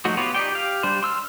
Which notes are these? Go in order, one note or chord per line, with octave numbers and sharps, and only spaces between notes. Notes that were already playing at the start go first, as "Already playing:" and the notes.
F3 F#3 A3 D#4 F#4
B3 F4 G4 B4 C#5
D#4 G4 D5 G5
G4 F5
G3 D4 C5
C6 E6 F6